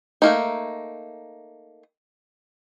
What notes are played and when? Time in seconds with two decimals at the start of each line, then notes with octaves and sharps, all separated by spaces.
0.22 A3 A#3 D#4